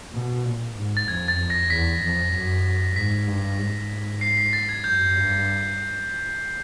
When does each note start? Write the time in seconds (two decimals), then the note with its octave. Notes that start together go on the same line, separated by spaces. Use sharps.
0.14 B2
0.45 A#2
0.77 G#2
0.97 A6
1.08 F2 G#6
1.28 A6
1.39 F2
1.50 A#6
1.70 E2 B6
2.02 F2
2.34 F#2
2.96 G#2 B6
3.27 G2
3.58 G#2
4.21 C7
4.37 B6
4.53 A6
4.69 G#6
4.84 F#2 G6
5.15 G2